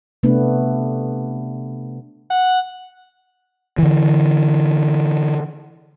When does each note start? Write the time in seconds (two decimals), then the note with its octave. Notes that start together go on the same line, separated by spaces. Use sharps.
0.23 C3 A3 B3 D4 B4
2.30 F#5
3.78 D3 E3